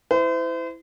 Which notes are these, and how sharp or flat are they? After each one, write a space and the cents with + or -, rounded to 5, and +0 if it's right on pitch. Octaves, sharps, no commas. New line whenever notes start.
E4 +0 C5 -40